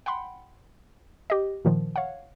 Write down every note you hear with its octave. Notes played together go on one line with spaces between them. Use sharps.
F#5 G5 B5 C6
G4 D#5
A#2 D#3 F3
C#5 F5 F#5